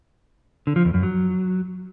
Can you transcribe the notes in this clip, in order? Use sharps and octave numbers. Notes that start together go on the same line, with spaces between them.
D3
F3
E2
F#2
F#3